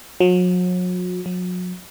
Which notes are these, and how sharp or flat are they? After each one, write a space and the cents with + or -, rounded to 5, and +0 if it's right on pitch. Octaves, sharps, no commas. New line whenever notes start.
F#3 -40
F#3 -40